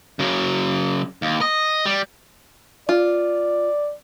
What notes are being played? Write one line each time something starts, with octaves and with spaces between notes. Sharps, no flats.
C#3 F#3
D#2
D#5
G3
F4 D5